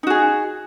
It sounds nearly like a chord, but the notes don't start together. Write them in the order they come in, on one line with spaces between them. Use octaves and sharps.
D#4 F#4 G#4